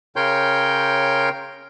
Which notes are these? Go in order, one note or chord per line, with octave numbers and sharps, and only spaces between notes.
C#3 A#4 C#5 G5 C6 G6